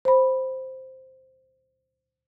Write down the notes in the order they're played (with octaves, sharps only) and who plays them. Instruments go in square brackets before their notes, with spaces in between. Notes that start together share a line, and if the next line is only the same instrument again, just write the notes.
[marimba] C5 B5